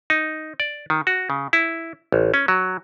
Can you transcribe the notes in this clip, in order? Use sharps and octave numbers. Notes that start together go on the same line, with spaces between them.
D#4
D5
D#3
F#4
C#3
E4
A1
C#4
F#3